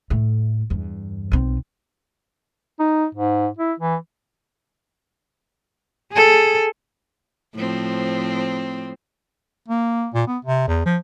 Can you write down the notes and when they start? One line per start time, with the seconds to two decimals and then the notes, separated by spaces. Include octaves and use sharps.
0.10 A2 A3
0.70 E2 G2
1.32 B1 C4
2.79 D#4
3.15 G#2
3.59 E4
3.80 E3
6.12 G#4 A4
7.55 A2 F3 C4
9.68 A#3
10.14 A#2
10.27 B3
10.45 C3
10.67 E2
10.86 F3